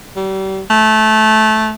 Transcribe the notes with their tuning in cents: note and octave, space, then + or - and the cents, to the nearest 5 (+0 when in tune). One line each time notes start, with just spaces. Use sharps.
G3 -35
A3 -15